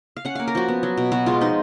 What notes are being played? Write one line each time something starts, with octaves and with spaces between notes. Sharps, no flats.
F5
C#4 F#5
A#3 F5
A#4
F3 F#4
B3
F#3
B2
B3 F#4
G#3 F4
F3 D#4